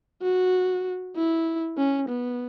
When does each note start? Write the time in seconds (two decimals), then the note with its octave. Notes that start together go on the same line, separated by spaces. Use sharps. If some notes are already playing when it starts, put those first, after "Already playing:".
0.23 F#4
1.16 E4
1.78 C#4
2.09 B3